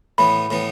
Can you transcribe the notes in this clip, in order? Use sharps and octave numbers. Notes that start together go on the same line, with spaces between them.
A2 E3 B3 B5
A2 E3 B3